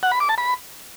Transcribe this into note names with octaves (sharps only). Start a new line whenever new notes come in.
F#5
B5
D6
A5
B5